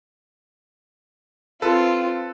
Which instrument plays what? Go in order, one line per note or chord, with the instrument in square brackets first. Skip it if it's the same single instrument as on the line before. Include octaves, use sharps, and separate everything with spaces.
[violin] C4 F4 [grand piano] A4 B4